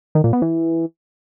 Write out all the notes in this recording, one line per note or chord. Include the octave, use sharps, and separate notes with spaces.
D#3
A#2
B3
E3